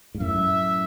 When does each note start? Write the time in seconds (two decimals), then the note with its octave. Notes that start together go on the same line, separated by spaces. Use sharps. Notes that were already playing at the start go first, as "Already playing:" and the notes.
0.15 G#2
0.20 F#2 A2 E5